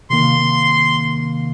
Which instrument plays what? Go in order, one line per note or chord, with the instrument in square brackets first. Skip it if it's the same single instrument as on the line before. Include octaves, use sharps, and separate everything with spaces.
[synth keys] C3 D#3 A#3 [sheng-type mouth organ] C6